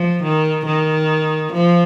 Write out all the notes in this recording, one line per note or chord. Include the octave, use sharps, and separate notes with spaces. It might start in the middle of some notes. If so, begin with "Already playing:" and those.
Already playing: F3
D#3
D#3
F3